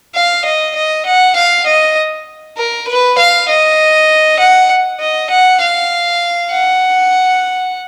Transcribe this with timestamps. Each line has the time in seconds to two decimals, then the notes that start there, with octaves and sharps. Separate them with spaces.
0.15 F5
0.45 D#5
0.75 D#5
1.06 F#5
1.36 F5
1.66 D#5
2.57 A#4
2.88 B4
3.18 F5
3.48 D#5
4.39 F#5
5.00 D#5
5.30 F#5
5.61 F5
6.51 F#5